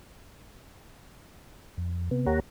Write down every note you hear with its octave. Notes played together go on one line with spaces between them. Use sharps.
F2
C3 B3
D#2 A#3 G4 C#5 F#5 A#5